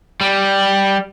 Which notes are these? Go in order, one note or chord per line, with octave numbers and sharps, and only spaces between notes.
G3